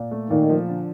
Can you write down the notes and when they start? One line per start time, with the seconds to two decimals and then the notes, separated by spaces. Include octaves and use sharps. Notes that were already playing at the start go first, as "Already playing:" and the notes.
Already playing: A#2
0.11 A3
0.30 A#2 D#3
0.49 F3
0.68 D3